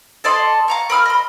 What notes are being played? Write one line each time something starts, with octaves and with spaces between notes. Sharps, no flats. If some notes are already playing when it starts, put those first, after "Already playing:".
A4 D5 D#5 C6
F5 A#5 C#6
A#4 B5 D#6 F6
D#5 B5